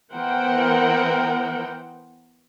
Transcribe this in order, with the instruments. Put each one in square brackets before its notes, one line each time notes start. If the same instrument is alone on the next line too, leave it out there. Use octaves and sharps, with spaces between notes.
[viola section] E3 B3 A#4 C5 F#5 G5